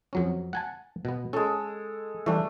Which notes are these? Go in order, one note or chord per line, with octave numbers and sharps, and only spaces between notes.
F2 F#3 C#4
F#5 G#5 A5
B2 B3
G#3 C#4 A4
E3 G3 A3 D4